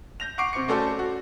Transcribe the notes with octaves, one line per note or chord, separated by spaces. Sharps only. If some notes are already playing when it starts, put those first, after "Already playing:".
G6 A#6 F7
F#5 C#6 D6 C7 D7
C3 C5 C#6 C#7
A3 C#4 F#4 A4 C5 D5
F#4